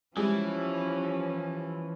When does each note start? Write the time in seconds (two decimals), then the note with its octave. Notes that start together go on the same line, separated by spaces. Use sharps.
0.17 E3 F3 G3 G#3 C#4 E4